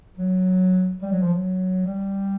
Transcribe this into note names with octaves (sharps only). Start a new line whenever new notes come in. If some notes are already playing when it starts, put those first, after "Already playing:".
F#3
G3
F#3
F3
F#3
G3